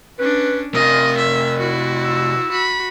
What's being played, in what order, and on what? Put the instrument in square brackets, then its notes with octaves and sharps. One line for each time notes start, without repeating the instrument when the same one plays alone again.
[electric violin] C#4 D4 [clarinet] B4
[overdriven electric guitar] C3 F4 [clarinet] A#4 [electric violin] D#5
[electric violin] E5
E4 F#4
[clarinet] E6
[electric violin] F#4 B5